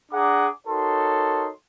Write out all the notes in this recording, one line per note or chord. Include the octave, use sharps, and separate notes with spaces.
D4 G#4 F#5 A#5 D6
D#4 F#4 A4 A#4 C#5 C6